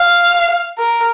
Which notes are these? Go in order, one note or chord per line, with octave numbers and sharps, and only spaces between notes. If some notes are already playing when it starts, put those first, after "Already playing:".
Already playing: F5
A#4